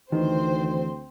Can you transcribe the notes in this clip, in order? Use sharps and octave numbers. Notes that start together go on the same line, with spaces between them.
D2 D#3 E3 C4 C5